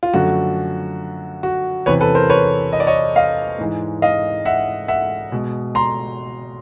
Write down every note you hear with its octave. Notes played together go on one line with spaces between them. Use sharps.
F4
F#2 D3 F3 A3 F#4
F#4
E2 C3 E3 B4 C#5
A4 B4
A#4 C5
B4 C#5
D#5
D5
C#5 D#5
D#5 F5
G#2 E3 G#3
D#5 F5
E5 F#5
E5 F#5
B2 G#3
A#5 C6